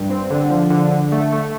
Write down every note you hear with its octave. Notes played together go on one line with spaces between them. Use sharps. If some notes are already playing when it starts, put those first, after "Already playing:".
Already playing: G2
C4
D3
F3
D3
D3
A3
A3